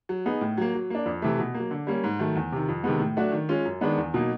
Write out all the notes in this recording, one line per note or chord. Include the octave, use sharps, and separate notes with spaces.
F#3
B3 D#4 G#4
A2
F#3 A#3
F#3
A#3 D4
F2
C3 E3 A3
B2
F#3 A#3
D3
G3 A#3 C#4
G#2
D#3 F#3 A3
E2
C3 D#3
F2
C3 D#3 G#3 B3
A2
F#3 A3 D4 F#4
D#3
G#3 C#4 F4
F#2
D#3 G#3 B3 D4
E2
B2 F#3 A#3 D#4